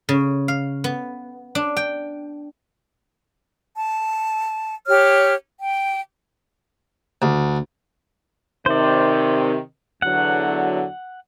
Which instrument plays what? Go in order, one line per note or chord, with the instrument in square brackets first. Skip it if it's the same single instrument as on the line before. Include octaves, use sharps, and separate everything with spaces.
[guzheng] C#3
F5
B3
D4
G5
[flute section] A5
G4 C#5 F6
G5
[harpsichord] D2
[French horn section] C3 D#3 [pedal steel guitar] C5 D5
[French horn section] E2 D3 F#3 [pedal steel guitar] F#5